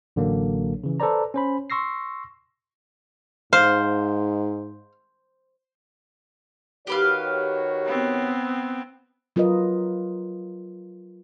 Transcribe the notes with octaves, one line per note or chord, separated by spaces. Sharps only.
A1 D3 F#3 A#3
C#3 E3
A4 B4 C5 D5 A#5
C#4 C5 B5
C6 C#6 E6 A#6 C7
G#2 C5 F5
D#3 F#4 G4 B4 C#5 F5
B3 C4
F#3 F4 A#4 B4 D#5